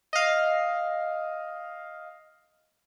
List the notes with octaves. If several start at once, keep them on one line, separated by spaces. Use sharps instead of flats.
D#5 F5